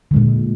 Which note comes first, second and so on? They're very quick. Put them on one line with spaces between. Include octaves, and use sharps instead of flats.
D3 G#3 A#2